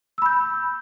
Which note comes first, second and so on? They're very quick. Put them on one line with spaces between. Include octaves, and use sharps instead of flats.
E6 B5 G6